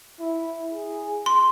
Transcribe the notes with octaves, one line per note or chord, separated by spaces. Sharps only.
E4
G#4
C6